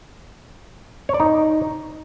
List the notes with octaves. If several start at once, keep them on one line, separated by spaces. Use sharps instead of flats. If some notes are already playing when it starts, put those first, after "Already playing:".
C#5
D5
D#4